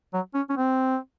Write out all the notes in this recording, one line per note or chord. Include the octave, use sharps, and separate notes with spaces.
F#3
C#4
C#4
C4